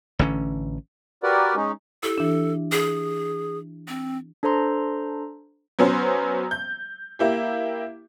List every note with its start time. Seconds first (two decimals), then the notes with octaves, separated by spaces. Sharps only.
0.19 A1 D3 C#4
1.23 F#4 G4 A#4 B4 D5 F#5
1.55 G#3 C#4 D#4
2.03 E4 G4 A4
2.18 E3 D4
2.72 G#4
3.88 C4
4.43 D4 A4 C5 A#5 C6
5.79 F#3 B3 C#4 C5
6.51 G6
7.19 A#3 E4 G4